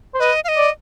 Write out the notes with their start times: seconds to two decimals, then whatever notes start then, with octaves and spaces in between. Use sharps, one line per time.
0.14 C5
0.20 B4 D#5
0.44 F5
0.48 D#5
0.57 D5